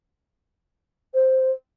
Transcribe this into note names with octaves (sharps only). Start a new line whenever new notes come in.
C5